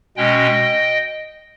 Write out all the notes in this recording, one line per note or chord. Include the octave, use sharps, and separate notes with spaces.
B2 G#3 C#4 D#5 G5